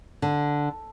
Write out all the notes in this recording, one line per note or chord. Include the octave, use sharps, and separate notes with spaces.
D3